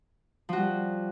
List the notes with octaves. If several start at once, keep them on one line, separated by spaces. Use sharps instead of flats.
F3 G3 F#4